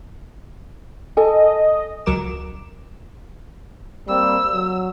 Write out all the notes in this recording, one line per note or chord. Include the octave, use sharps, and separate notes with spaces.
A4 D#5 G#5
C#2 F#3 A#4 D6 E7
G3 A#3 C4 E6
F#3